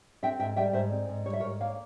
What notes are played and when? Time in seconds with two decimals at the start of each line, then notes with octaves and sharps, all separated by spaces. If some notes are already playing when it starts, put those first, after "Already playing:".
0.23 C4 E5 G5
0.39 G#2 E5 G5
0.56 G3 E5 G5
0.73 G#2 C5 E5
0.92 C4
1.09 G#2
1.25 G3 C#5
1.33 E5
1.40 G#2 A#4 C#5
1.60 A#3 C#5 F5